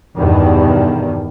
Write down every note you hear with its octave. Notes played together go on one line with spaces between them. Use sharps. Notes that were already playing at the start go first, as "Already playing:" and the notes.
E2 G2 B2 D#3